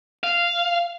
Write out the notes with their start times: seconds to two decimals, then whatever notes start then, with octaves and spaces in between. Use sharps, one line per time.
0.24 F5